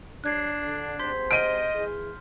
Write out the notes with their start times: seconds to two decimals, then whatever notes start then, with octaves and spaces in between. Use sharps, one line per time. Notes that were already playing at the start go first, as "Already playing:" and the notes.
0.24 G3 D4 C#5 F#6 G#6 C7
0.60 D3
1.00 G#2 C3 C5 C6 G6 B6
1.31 D#5 F6 D7 D#7 G7
1.74 E3 E4 G#4